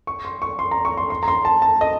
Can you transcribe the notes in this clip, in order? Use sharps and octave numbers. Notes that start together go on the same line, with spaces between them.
C#6
C6
C#6
C6
A#5
C#6
C6
C6
A#5
C6
A5
A5
D#5